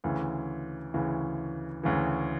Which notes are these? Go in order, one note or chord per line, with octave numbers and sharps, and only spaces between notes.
D2 C#3 E3
D2 C#3 E3
D2 C#3 E3